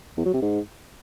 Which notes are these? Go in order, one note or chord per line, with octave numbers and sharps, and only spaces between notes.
E2
F#3
C3
G#2